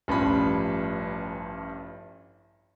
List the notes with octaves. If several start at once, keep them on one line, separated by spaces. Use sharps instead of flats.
A1 G2 F3 C#4 B5